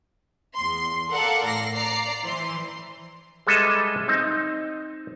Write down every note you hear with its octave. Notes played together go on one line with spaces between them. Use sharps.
E2 C6
A4 A#4 D5 F5 F#5 A5
A2 A#6 C7
D5 A#5 C7
E3 C5 C6
G3 G#3 A4 B4 D#5 E5
C4 D#4